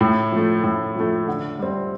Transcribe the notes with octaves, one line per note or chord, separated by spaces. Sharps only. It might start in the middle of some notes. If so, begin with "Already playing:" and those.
A2
F3 A3
A2
F3 A3
D3
G3 C4